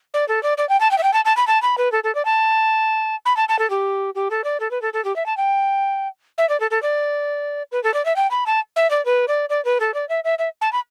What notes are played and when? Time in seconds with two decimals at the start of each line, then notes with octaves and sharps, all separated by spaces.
0.14 D5
0.28 A4
0.43 D5
0.58 D5
0.69 G5
0.80 A5
0.91 G5
0.98 E5
1.03 G5
1.13 A5
1.25 A5
1.37 B5
1.47 A5
1.62 B5
1.78 B4
1.92 A4
2.04 A4
2.15 D5
2.25 A5
3.25 B5
3.37 A5
3.49 A5
3.59 A4
3.70 G4
4.15 G4
4.30 A4
4.44 D5
4.60 A4
4.71 B4
4.82 A4
4.93 A4
5.05 G4
5.16 E5
5.26 A5
5.37 G5
6.38 E5
6.49 D5
6.60 A4
6.71 A4
6.82 D5
7.72 B4
7.83 A4
7.94 D5
8.05 E5
8.16 G5
8.31 B5
8.46 A5
8.76 E5
8.90 D5
9.05 B4
9.28 D5
9.49 D5
9.65 B4
9.80 A4
9.94 D5
10.09 E5
10.24 E5
10.39 E5
10.61 A5
10.73 B5